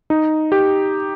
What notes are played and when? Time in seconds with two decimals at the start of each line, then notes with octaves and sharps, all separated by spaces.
0.10 D#4
0.52 G4